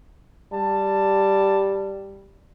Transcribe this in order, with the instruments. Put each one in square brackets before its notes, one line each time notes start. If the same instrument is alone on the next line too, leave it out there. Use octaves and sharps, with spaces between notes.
[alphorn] G3 [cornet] A5